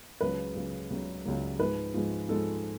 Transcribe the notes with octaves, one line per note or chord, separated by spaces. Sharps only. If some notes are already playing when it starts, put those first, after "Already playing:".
C#2 C#3 F#3 B4
C#2 C#3 F#3
C#2 C#3 F#3
C#2 C#3 F#3
G#2 F3 G#3 B4
G#2 F3 G#3
G#2 F3 G#3 A4